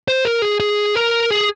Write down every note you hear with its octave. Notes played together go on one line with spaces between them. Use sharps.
C5
A#4
G#4
G#4
A#4
G#4